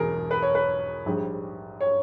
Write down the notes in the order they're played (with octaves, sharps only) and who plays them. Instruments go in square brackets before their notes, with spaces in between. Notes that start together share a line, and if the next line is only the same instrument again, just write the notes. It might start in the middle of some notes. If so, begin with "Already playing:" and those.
Already playing: [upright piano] E1 E2 B2 G#4 A#4
B4
C#5
B4
A#1 G#2 G3
C#5